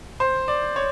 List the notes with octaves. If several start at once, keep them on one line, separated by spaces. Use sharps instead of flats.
C5
D5
C#5